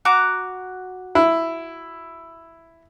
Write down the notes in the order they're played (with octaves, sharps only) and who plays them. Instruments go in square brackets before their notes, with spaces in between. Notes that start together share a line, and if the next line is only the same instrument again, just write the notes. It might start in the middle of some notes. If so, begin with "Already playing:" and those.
[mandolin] F#4 A#5 D6
[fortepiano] E4